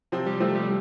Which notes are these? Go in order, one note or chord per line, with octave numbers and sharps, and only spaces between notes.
C3 F3 C4
G3
C3 F3 A3 C4
G3